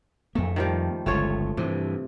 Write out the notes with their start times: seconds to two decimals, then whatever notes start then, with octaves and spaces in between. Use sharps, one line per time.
0.35 F2 A3 A#3
0.56 D#3 F3 G3
1.06 G1 C#2 A3 F4 C#5
1.57 G2 C3 E3